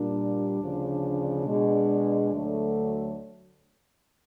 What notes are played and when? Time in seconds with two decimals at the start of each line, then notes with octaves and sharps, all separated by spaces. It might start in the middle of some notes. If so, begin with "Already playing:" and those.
Already playing: A#2 G3 D4
0.59 D2 C#3 F3
1.45 B2 G#3
2.31 D2 D3 F#3 A3